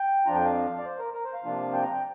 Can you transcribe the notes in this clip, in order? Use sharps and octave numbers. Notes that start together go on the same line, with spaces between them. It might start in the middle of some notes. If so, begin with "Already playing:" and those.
Already playing: G5
F2 F3 D4 F4 A#5
G5
F5
D5
C5
A#4
A#4
C5
F5
C3 F3 A#3 D4 F4
G5
A#5
G5